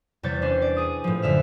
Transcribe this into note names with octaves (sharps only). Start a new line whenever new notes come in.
E2 C3 G3 C#5 G6 A6
C#4 D4 C6
D5
G#4 D#6
A2 F3
F#2 D3 E5 F6